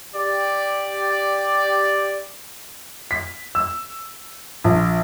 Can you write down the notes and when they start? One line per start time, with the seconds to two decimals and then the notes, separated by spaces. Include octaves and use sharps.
0.14 G4 D5
3.11 B6
3.55 E6
4.64 A#1